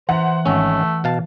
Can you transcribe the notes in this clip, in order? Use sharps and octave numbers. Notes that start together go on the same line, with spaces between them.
E3 C5 E5 F#5 A#5
G#1 A3 C#4
B2 F5 A5